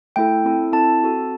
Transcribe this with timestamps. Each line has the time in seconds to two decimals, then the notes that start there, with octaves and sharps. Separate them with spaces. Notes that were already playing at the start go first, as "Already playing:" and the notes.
0.16 A3 E4 A4 G5
0.45 C4 E4 A4
0.72 C4 E4 A4 A5
1.02 C4 F#4 A4